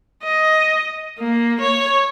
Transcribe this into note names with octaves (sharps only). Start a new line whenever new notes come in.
D#5
A#3
C#5